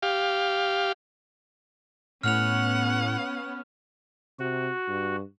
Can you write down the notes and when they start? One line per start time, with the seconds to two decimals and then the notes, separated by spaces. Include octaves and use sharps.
0.02 G4 F5
2.23 A2 B3 C#4 F#5 F6 F7
4.39 C3 F#4
4.88 G2